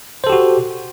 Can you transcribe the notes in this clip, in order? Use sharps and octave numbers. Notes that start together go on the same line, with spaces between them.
F#4 G4 A4 C5